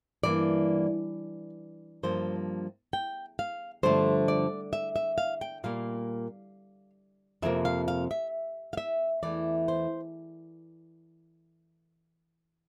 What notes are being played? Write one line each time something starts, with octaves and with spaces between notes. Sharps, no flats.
G2 E3 A#3 D5
G2 F3 A#3 C5
G5
F5
G2 D3 F3 A3 C5
D5
E5
E5
F5
G5
A#2 G3 A#3 F5
F2 C3 F3 A#3 E5
F5
F5
E5
F5
E5
E2 E3 A3 D5
C5